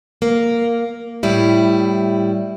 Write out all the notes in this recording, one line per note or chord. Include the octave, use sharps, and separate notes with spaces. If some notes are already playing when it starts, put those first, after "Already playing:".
A#3
A2 G3 E4